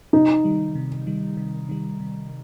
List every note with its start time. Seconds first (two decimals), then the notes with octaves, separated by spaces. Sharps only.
0.13 C3 D#4
0.44 D#3 G3
0.75 C3
1.07 D#3 G3
1.37 C3
1.69 D#3 G3
2.00 C3